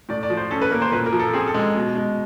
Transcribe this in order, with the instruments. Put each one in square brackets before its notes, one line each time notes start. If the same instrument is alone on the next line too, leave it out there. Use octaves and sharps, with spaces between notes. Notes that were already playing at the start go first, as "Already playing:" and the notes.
[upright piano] A2 D5
D5
F3
C5
C#4 A4
B4
A#3 A#4
C5
A#2 B4
A#4
F3
A4
C4 G#4
A4
G#3
B2
G#3